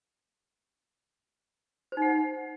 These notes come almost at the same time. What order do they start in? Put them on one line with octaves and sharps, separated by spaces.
C5 D#4 F#5